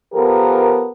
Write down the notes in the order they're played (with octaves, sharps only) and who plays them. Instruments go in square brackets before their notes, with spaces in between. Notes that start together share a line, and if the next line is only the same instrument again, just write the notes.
[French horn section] F3 B3 G4 A4 A#4